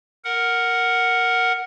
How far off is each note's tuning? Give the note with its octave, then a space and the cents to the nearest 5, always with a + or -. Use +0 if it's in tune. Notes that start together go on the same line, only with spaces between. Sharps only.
A#4 +0 F#5 +0